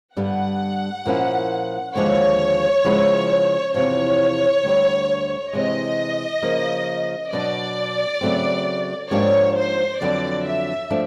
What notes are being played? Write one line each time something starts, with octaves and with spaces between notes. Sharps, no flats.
G2 D3 G3 B3 F#5
A#2 F3 A#3 C#4 E4
D#2 D3 F3 G#3 B3 C#5
C#3 F3 G#3 B3 E4
E2 C3 F3 C#5
D2 D3 G3
C3 E3 G#3 D#5
C#3 F3 A#3
B2 F#3 B3 D4 D5
C#3 F#3 A3 C4
G#2 F3 A#3 D4 G4 C#5
C5
F2 D3 F#3 B3 D5
E5
F3 A3 D4